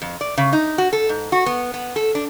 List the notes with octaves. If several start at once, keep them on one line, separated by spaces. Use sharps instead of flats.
F2
D5
C#3
D#4
F#4
A4
G#2
F#4
B3
B3
A4
D4